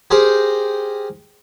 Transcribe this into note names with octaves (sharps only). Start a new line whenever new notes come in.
G4 G#4 A#4 C5 A#5